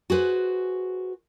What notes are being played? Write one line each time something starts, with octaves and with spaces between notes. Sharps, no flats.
F#4 G#4 B4 C5